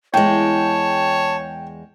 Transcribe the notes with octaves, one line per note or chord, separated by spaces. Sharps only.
E2 G#3 C#5 G5 A5